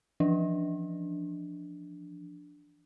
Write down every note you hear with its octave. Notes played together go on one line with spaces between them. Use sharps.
E3 F3 D4